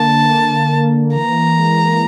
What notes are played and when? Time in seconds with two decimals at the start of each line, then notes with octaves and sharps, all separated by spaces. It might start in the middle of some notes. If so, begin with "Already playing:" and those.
Already playing: D3 A#3 A5
0.29 A#3
0.72 A#3
1.15 E3 A#5
1.58 G#3